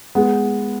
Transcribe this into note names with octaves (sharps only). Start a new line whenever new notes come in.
G#3 B3